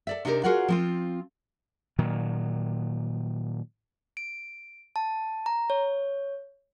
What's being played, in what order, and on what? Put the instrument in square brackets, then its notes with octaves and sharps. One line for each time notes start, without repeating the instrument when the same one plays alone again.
[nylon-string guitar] A4 D5 E5
C3 D4 D#4 G4 A4 A#4
F4 F#4 G#4 A#4 C#5 F#5
F3 C4 F4
[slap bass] A#2 D#3 F#3
[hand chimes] D7
A5
A#5
C#5